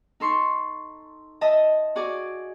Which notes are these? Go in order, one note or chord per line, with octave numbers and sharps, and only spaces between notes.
D#4 A4 C6 C#6
D#5 E5 A5 D#6
F#4 G#4 D5 G#5 D6